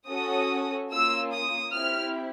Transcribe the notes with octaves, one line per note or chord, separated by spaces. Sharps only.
C#4 F#4 A4 D#6
A#3 C#4 F4 E6
D#6
C4 E4 G4 F6